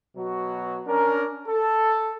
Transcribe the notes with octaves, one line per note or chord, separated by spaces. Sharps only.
B2 F#3 F#4
C#4 D4 A#4
A4